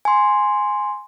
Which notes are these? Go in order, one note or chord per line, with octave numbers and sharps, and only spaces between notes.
G#5 C6